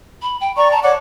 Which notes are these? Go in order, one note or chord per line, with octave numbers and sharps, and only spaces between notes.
B5
G5
D5 A#5 C#6
A5 A#5
C#5 D5 F#5 D6